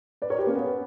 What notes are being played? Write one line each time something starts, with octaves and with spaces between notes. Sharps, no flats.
B4 D5
A#4 C#5
G4 B4
A#3 C#4
B3